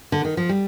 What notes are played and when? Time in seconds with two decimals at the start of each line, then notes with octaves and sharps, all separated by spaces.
0.12 D3
0.25 D#3
0.37 F3
0.49 G3